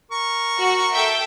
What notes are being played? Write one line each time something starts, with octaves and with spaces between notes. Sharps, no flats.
A#4 C#6
F#4
A4 E5 G5